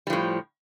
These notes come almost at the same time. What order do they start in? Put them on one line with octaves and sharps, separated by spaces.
G3 F3 A2